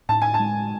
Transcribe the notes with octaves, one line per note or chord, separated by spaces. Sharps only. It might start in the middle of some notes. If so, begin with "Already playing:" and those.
A2 A5
G#5
A5
G#3